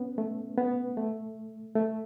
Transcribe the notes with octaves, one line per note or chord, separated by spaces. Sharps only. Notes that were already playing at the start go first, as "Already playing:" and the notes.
Already playing: B3 C#4
A3
B3
A3
A3